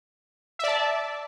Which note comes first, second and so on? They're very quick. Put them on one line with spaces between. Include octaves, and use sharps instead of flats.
E5 D5 A5